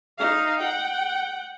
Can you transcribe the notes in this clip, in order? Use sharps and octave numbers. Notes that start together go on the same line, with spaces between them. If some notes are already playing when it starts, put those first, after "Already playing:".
D#4 F5
F#5 G5